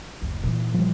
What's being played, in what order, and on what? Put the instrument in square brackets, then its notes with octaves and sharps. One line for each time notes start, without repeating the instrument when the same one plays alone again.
[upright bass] F#1 D2
A#2 E3
[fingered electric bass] F3 G3